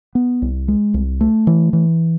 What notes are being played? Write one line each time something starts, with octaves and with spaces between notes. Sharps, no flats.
B3
C2
G#3
C2
A3
E3
E3